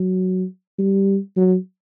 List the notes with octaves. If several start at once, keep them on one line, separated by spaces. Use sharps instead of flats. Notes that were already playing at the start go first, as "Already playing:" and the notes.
Already playing: F#3
G3
F#3